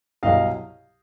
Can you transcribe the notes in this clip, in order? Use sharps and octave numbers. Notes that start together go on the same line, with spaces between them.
C2 B2 F#3 D#5 F5